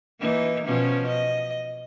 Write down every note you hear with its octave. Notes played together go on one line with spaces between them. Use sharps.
E3 A#3 D#4
B2 F3 C#4
D#5